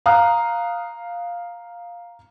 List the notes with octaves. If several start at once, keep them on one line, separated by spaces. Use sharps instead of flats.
F5 A#5 D#6 F6 F#6